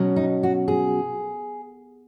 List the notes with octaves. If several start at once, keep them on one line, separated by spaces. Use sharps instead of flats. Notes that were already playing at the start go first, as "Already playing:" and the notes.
Already playing: B2 F#3 C#4
D#4
F#4
G#4